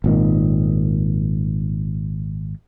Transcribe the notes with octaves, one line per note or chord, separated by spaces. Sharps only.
G#1 A#2 D#3